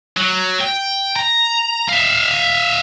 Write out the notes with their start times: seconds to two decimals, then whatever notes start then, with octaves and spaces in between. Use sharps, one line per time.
0.17 F#3
0.61 G5
1.16 A#5
1.88 E5 F5